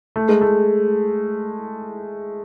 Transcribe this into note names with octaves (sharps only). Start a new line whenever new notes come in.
A3
G#3
A3